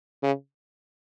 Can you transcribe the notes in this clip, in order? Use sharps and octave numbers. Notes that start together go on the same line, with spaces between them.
C#3